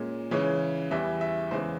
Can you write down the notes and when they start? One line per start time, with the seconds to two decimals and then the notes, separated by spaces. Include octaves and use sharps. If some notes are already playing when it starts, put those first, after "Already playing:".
Already playing: A#2 G#3 C#4
0.31 C#3 E3 G#3 C#4 C#5
0.91 E2 E3 G3 E5
1.21 E5
1.51 E2 C#3 E3 G#3 C5